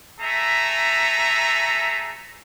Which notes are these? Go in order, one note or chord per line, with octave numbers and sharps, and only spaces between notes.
A3 G#4 E5 A#5